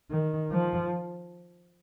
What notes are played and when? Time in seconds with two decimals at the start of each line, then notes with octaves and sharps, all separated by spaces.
0.11 D#3
0.51 F3